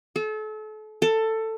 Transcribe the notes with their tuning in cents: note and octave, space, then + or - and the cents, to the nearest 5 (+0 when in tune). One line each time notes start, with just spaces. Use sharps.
A4 -35
A4 +15